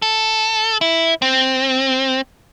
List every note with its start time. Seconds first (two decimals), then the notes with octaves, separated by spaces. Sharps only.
0.02 A4
0.81 E4
1.22 C4